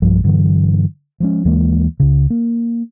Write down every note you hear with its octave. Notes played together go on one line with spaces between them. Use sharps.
B1 G2 F3 G3
G2 D3 E3 F#3
F3 G#3 C#4
D#2 E3 G#3 A#3
C#2 C#3
A#3